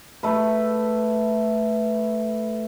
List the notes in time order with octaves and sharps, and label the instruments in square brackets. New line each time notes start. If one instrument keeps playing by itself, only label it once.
[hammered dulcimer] A3 B4